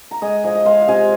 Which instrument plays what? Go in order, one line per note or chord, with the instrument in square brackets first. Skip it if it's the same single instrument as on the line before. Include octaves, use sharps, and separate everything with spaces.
[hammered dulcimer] A#5
G#3 D#5 G#5
F3 D#5 G#5
D#5
G#3 C5 F5
F5
C3 D#5 G#5